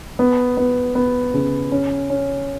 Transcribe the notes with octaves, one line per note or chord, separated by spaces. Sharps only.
B3
B3
B3
C#3
C#4
C#4